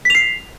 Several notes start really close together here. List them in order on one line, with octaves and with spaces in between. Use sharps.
B6 F7 C7